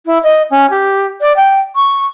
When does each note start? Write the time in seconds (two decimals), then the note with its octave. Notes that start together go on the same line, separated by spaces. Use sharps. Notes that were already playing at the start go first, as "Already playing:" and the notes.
0.06 E4
0.23 D#5
0.51 C#4
0.70 G4
1.21 D5
1.37 G5
1.76 C#6